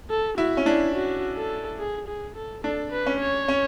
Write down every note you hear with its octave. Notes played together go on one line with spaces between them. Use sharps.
A4
E4 F#4
C#4
D4 E4
F#4
A4
G#4
G#4
A4
D4 A4
B4
C#4
C#5
C#4